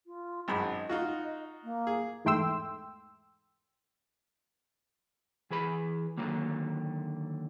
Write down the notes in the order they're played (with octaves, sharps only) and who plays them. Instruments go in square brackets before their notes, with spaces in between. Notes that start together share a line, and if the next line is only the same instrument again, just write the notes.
[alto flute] F4
[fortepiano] G#1 F#2 B5 [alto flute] D#5
[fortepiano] D#4 F4 F#4
[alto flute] A#3
[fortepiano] G#4
[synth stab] E2 G#2 A3 G5 C6 E6
[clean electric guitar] E3 G#4 B4 B5
D3 D#3 F#3 A#3